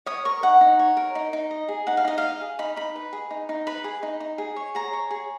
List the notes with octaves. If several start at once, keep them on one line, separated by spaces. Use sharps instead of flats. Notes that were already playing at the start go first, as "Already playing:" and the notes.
C#5 D#6
A#4 C#6
D#4 F#5
D#4
C#5
A#4
D#4
D#4
D#5
G#4
D#4 F#5
F5
D#4 D#5
D#5 F5
G#4
D#4 B5
D#4 B5
B4
G#4
D#4
D#4
B4 B5
G#4
D#4
D#4
G#4
C#5
G#4 A#5
C#5
G#4